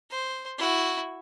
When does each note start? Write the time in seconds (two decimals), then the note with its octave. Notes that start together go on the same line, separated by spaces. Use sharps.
0.11 C5
0.58 E4 F#4